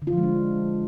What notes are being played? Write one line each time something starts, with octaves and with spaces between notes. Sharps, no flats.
D3
F4
F3
G#3
D4